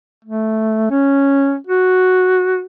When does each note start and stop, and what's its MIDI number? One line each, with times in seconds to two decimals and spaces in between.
0.24 0.89 57
0.90 1.57 61
1.67 2.65 66